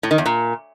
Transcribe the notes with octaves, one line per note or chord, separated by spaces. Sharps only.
A2
D#3
E2
A#2